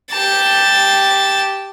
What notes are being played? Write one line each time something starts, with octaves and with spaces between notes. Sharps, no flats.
G4 A5